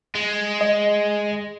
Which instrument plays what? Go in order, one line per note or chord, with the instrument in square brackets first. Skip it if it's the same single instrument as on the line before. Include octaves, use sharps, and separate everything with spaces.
[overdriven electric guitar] G#3
[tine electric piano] D#5